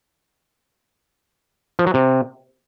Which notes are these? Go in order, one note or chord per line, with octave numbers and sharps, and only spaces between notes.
F3
F#3
C3